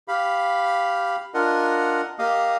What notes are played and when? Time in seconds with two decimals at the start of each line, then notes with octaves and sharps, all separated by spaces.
0.08 G4 F5 B5
1.34 D4 F4 A#4 D#5 F#5
2.19 A#3 G4 D#5 F5 D#6